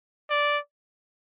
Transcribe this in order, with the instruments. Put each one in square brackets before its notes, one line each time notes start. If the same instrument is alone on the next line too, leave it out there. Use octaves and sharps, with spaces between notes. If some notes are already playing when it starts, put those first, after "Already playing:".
[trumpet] D5